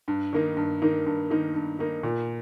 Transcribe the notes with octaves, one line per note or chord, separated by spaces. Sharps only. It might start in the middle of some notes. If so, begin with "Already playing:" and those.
G2
D#3 A#3 D#4
G2
D#3 A#3 D#4
G2
D#3 A#3 D#4
G2
D#3 A#3 D#4
A#2